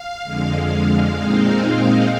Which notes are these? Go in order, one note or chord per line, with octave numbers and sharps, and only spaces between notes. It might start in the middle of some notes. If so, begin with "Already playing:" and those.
Already playing: F5
F2 D3 G#3
A#2 G#3 C4 D#4